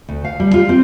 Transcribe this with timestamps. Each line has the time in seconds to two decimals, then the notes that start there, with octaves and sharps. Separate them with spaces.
0.09 D2
0.25 F5
0.40 G3
0.54 F4
0.69 C4